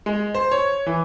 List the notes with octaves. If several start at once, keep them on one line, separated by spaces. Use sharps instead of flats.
G#3
C5
C#5
E3